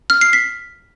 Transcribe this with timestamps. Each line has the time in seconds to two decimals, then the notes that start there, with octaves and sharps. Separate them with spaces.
0.10 F6
0.21 C7
0.33 B6